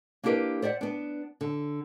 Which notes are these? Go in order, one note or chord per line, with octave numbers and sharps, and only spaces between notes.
A#3 D4 E4 G4 A#4 B4
C5 D5 E5 F#5
B3 D4
D3